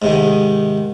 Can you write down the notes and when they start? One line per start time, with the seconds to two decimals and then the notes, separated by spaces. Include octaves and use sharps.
0.02 G#2 C3 D#3